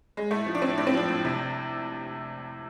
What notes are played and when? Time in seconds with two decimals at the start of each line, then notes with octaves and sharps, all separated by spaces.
0.17 G#3
0.31 A2 A3
0.46 F3
0.55 D4
0.62 A2 C4
0.78 A2 D4
0.87 C4
0.94 F3 D4
1.09 A2
1.25 C3